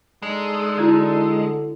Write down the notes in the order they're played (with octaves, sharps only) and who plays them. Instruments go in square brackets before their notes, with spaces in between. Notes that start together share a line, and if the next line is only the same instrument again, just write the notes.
[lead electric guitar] G#3 [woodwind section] D4 D#4 A4
[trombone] D3 [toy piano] E4 F#4 D5